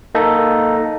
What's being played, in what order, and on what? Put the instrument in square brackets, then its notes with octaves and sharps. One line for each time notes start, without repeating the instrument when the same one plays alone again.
[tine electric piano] A#3 D#4 A4